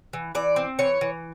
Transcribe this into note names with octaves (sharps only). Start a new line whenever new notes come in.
E3
E3 D5
C4
E3 C#5
E3